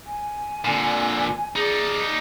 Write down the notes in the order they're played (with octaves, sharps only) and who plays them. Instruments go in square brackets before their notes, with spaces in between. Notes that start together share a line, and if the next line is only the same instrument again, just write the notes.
[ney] G#5
[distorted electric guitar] A#2 D3
[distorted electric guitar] D#4 D5 [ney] G#4